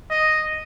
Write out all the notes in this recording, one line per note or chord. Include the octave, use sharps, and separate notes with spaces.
D#5